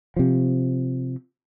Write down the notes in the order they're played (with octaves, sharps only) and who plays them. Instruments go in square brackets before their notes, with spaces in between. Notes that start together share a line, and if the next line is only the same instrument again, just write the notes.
[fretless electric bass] C3 F3